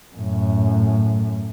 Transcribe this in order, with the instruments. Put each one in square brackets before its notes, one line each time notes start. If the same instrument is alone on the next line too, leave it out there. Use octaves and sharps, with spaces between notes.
[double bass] F#2 A2